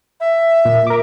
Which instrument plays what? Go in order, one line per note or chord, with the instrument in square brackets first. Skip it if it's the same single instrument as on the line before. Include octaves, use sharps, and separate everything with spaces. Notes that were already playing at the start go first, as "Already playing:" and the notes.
[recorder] E5
[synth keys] A#2
A#4 D6